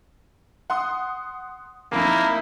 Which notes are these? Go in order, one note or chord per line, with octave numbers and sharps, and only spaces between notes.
F#5 C6 D#6
F1 F2 A#3 D#4 E4